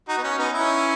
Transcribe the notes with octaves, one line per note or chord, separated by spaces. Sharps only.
D#4 F#4
B3
C#4
B3 D#4
C#4 E4